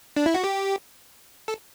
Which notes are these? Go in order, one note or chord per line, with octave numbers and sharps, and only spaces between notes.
D4
E4
F#4
G4
A4